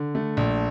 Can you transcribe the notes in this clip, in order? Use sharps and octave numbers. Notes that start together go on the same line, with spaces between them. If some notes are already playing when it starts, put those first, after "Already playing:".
Already playing: D3
A3
A#1